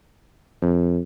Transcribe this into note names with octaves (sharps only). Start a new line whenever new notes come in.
F2